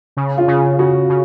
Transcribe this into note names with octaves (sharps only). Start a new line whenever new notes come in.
C#3
F4
C#3
C#3 F#4
C#3